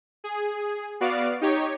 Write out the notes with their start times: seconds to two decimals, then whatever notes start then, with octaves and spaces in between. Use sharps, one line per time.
0.24 G#4
1.00 B3 F#4 D5 F5 D7
1.41 D#4 G4 C#5